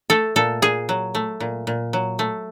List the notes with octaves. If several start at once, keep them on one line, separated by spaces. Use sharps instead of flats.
A3 A4
A#2 A4
A#2 G#4
F#3
A3
A#2
A#2
F#3
A3